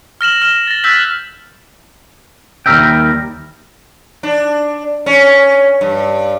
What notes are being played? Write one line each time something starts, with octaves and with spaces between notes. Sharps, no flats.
F6 A#6 E7 F#7
F6 A#6 E7
A6 A#6
E6 F#6 G6 A6 B6 F#7
D#2 E3 G3 A#4 E5 G5
D4
C#4
G2